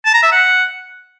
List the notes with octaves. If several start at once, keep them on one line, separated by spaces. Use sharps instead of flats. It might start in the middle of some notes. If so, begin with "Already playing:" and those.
A5
A#5
E5
F#5